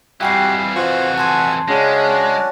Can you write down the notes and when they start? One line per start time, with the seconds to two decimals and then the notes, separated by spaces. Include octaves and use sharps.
0.21 F2 E3 G3 F#4 G4 F5 G#5 C7
0.75 F4 F#4 C5
1.18 G#5 A5 C6 E6 G#6
1.68 C#3 G#3 C#4 D4 F#4